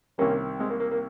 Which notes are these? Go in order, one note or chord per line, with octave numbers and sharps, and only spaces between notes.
C2 C3 D#3 G3 A#3 C#4
G#3 C4
A#3
A#3
A#3